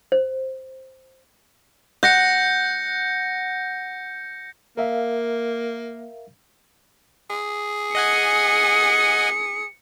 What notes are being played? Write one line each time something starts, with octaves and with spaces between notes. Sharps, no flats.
C5
F#5 G6 A#6 C#7
A#3 A#4 E5 F5
G#4
D#5 F#5 G#5 C#7